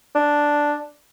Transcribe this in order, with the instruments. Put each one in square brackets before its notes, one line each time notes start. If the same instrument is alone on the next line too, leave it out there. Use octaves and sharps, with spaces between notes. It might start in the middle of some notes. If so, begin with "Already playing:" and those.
[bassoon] D4